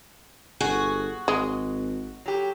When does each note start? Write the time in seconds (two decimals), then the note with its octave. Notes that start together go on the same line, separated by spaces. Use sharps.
0.61 G1 F#4 G#4
1.28 G#1 G#3
2.26 F#3 G4